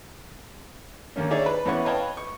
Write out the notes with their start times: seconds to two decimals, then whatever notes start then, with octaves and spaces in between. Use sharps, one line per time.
1.16 D#2 D3 A#3 C#4
1.31 C#4 D#4 G#4 C#5 D5 E5
1.46 B4
1.65 E2 E3 C#4 B4 F#5 C#6
1.85 B4 C#5 D#5 F5 G5 A5
2.17 C#6